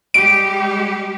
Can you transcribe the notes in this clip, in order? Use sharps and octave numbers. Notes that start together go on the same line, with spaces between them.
G3 G#3 G4 D7